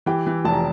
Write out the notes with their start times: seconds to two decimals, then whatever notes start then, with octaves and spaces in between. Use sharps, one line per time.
0.06 E3 G4 G5
0.26 E3
0.45 F1 A5
0.54 A#5